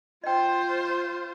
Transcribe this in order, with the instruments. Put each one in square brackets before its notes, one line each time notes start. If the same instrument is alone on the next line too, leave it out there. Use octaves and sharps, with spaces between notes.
[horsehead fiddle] F4 C5 [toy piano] D#5 G5